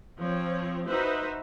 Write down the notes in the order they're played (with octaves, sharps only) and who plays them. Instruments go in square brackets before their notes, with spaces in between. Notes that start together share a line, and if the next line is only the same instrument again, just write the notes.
[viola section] F3 C4 C#5
D#4 F#4 B4 C5 E5